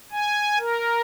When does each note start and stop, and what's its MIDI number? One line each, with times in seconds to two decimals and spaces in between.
0.12 0.58 80
0.59 1.01 70